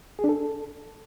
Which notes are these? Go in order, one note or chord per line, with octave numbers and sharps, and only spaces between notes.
G#4
D4
A4